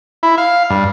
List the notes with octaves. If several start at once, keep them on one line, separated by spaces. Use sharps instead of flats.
E4
F5
G2